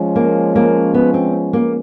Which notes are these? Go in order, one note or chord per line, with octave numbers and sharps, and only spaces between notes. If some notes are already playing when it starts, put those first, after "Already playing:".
Already playing: F3 G#3 C#4
A#3
A#3
B3
C4
A#3